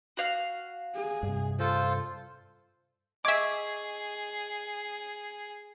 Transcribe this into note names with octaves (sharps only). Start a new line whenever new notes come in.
F#4 F5
G#4
G2 C3
F4 A4 C5
G#4 D#5 E5 C#6 D6 G#6